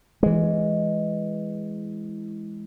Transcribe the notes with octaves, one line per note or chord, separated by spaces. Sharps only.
E3 G#3